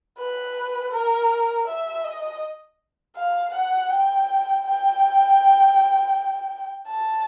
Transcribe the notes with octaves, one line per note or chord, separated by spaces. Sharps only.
B4
A#4
E5
D#5
F5
F#5
G5
G5
A5